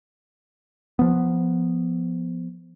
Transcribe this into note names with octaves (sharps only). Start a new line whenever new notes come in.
F3 B3